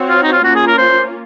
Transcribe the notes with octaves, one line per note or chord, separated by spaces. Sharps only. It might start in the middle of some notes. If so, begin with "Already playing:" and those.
Already playing: C4 F#4 C#5
F4
D#4
F4
A#3 C#4 F4 F#4
G#4
A#4
C5